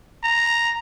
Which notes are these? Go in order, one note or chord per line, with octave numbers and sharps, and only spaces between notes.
A#5